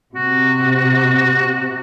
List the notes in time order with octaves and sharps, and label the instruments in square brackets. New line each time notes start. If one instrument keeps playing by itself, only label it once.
[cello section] C3 [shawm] F#4